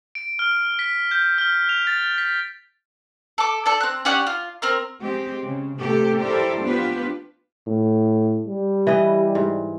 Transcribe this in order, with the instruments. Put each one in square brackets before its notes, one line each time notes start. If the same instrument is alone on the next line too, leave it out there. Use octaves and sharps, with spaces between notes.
[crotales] D7
F6
B6
G6
F6
F7
A6
B6
[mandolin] A4 D6
A4 D5
C4 F#6
C#4 G4 D5 F#5
F4
C4 A#4 F6
[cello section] G#3 C4 G4
C#3
C3 A3 A#3 G4 A4
E4 G4 A4 A#4 C5 D5
A#3 B3 D4 F4 G4 B4
[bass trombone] A2
G3
[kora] E3 B4 D#5
G#2